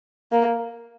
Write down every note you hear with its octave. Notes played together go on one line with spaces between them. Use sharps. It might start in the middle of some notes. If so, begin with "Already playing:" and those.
A#3